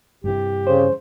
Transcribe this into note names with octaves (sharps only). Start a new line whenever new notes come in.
G2 C3 E3 G4
C#3 C5